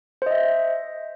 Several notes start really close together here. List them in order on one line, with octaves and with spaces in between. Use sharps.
C5 D#5 E5